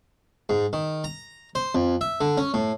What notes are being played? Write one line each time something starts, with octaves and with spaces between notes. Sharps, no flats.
G#2
D#3
A#5
C5
F2
E5
D3
C#4
A2